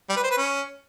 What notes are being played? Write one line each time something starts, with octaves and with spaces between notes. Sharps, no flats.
G3
B4
C5
B4
C#4